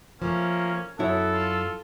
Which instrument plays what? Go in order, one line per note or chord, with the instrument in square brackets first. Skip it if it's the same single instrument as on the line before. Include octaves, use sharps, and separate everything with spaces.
[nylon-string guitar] F3 A3 [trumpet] A#3 [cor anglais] C#4
[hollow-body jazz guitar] F#2 E4 [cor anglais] B3 [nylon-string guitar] F#4 C#5 [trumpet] A4
[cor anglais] F4